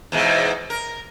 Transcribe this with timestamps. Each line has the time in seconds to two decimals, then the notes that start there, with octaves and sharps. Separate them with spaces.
0.12 E2 G#2 B2
0.70 A#4